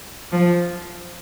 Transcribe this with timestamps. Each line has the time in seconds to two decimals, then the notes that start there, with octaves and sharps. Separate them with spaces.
0.32 F3